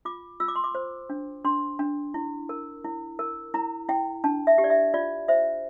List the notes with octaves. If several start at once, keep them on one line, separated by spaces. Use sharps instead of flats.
F4 D6
F4 E6
D6
C6
D6
C5
D4
D4 C6
D4
E4
A#4
E4
A#4
E4 A#5
E4 G5
D4 A5
E5
G4
D5
E5
F4 D5
C5 E5